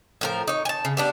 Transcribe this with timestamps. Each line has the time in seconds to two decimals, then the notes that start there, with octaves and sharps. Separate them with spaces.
0.21 A2 F3 A#4
0.48 D#4 C#5
0.65 G#5 A5
0.85 C#3
0.97 G3 B3 D4